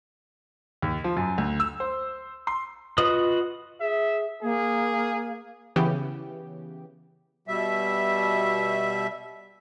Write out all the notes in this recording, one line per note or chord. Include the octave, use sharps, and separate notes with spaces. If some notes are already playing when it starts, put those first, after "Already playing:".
D#2
F3
F#2
D2
E6
C5
C6
F4 F#4 B4 D#5 D#6
G#4 E5
A#3 G#4
C#3 E3 B3 G4
B2 G3 E5